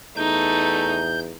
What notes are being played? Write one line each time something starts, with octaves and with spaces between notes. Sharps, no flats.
E2 A3 D#4 G6